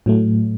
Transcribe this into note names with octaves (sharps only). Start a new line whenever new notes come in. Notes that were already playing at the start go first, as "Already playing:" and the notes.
A2 F#3 A3